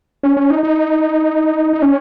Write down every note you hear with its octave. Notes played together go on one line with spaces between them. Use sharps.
C#4
C#4
D#4
D#4
D#4
C#4